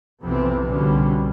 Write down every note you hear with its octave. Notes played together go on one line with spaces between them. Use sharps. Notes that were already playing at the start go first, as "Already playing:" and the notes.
B1 F2 C3 E3 B3 C4
C2 F2 B2 D3 G3 C#4